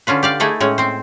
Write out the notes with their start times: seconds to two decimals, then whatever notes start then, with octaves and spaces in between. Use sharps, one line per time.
0.07 D3 C#4 F4 B4
0.23 G4 D5 F5
0.40 A3 D#4 E4 G#4 A4
0.60 A2 G#3 C#4
0.78 C4 C5